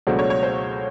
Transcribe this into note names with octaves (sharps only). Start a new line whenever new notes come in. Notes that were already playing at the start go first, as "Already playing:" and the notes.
C#2 B2 F#3 A3 D4 C5
C#5
C#5
C5